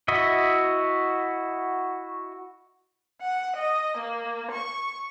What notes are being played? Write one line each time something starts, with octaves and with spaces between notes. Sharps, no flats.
E4 F#4 D#5 E5
F#5
D#5
A#3
C#6